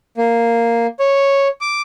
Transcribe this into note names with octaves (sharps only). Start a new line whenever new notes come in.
A#3
C#5
D6